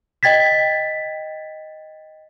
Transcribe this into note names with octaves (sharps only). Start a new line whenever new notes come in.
D#5 G5 G#6 A6 B6